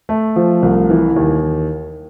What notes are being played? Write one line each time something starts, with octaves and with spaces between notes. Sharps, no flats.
A3
F3
C2
E3
D#2